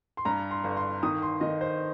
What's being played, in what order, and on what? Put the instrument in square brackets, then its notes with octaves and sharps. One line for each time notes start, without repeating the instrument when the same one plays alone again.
[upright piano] C6
G2 A#5
C6
G1
C6
D#3 D#6
C6
D#3 D#5
C5